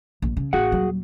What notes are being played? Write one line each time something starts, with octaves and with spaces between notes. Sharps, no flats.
A#1
C#3
A1 F#4 G#4 F#5
D#1 F#3